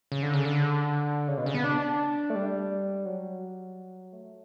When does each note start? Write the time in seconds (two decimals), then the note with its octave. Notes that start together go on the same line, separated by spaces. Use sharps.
0.12 C#3
0.22 D3
0.34 C#3
0.45 D3
1.28 C#3
1.37 B2
1.46 C#3
1.54 B3
1.64 D4
2.30 A3
2.35 G3
3.05 F#3
4.13 A3